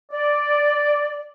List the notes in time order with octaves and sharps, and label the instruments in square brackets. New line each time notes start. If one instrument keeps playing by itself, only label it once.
[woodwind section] D5